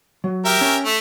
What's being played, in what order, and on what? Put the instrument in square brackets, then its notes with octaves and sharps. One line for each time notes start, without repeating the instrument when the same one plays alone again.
[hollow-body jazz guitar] F#3
[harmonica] G4 A#4 E5
[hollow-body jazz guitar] C#4 G#5
[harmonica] A3